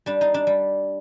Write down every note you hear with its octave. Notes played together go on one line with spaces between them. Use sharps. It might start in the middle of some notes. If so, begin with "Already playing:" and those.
G3 D4
D#4
D4
G3